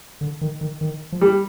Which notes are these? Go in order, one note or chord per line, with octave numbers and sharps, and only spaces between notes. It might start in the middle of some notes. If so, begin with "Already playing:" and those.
D3
D#3
D#3
D#3
F3
G3